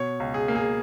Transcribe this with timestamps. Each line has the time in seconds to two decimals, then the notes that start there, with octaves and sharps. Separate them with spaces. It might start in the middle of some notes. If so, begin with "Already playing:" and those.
Already playing: B2 C#5
0.20 C#2
0.34 G#4
0.48 A#3
0.55 G#4